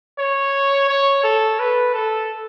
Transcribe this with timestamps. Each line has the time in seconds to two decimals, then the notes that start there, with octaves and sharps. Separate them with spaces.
0.18 C#5
0.88 C#5
1.23 A4
1.59 B4
1.94 A4